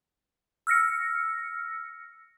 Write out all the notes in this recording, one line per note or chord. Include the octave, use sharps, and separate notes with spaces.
E6 F6 A#6 C#7